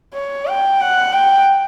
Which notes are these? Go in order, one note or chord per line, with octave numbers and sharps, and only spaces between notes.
C#5
G5
F#5
G5